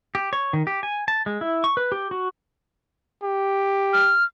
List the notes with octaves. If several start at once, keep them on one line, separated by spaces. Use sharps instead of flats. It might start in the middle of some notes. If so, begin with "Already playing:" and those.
G4
C#5
D#3
G4
G#5
A5
G#3
E4
C#6
B4
G4
F#4
G4
F6